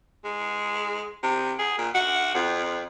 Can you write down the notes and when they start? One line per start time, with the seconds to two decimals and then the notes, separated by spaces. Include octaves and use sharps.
0.24 G#3
1.23 C3
1.59 G#4
1.78 A#2
1.94 F#4
2.34 F2